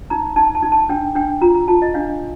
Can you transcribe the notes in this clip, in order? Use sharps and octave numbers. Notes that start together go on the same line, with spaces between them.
D#4 A#5
D#4 A5
A5
D#4
A5
D4 G5
D4 G5
F4 A#5
A#5
F4 A5
D#5
D4 F5